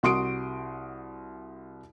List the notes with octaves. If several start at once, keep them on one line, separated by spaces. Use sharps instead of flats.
C2 F#4 C6 D#6 D7